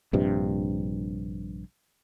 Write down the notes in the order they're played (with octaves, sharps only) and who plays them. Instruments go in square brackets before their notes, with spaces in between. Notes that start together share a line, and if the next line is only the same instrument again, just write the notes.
[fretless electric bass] A#1 G2 C3